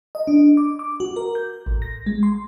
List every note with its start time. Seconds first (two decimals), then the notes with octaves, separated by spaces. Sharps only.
0.15 D#5
0.27 D4
0.57 D6
0.79 D6
1.00 F#4
1.16 A#4
1.35 G6
1.66 A1
1.82 A#6
2.06 G#3
2.23 C6